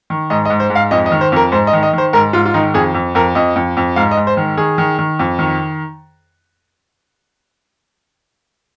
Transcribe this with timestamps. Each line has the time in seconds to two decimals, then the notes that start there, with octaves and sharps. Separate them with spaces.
0.10 D#3
0.30 G#2 D#5
0.45 D#5
0.50 G#2
0.60 C5
0.70 G#2
0.75 F5
0.91 F2 D#5
1.06 D#5
1.11 D#3
1.21 C5
1.32 F2 A#4
1.52 G#2 C5
1.67 D#5
1.73 D#3
1.83 D#5
1.93 D#3 C5
2.13 G#2 A#4
2.33 G#2 F4
2.45 F4
2.54 D#3 D#4
2.74 F2 G#4
2.94 F2
3.15 F2 A#4
3.35 F2 D#5
3.56 F2
3.77 F2
3.96 G#2 F5
4.11 D#5
4.17 G#2
4.27 C5
4.37 D#3
4.57 D#3 G#4
4.78 D#3
4.98 D#3
5.19 F2
5.39 D#3